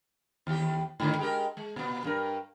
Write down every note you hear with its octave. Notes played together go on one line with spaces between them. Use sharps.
D#2 G4
G#2 D3 D#3
G#3 G4 A#4
G#3
A#2 B3
G2 A#4